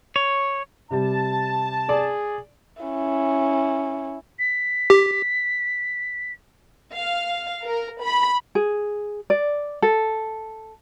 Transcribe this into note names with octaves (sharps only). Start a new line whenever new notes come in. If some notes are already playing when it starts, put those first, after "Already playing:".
C#5
C3 G3 G4 A5
G#4 D5
C#4 E4
B6
G4
F5
A#4
B5
G#4
D5
A4